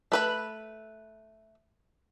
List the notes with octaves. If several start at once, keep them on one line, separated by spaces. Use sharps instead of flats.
A3 B4 B5